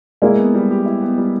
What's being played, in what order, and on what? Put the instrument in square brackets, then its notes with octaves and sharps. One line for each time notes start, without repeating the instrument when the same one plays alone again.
[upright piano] G#3 A#3 [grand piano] E4
[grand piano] B3
G3
G4
E4
B3
G3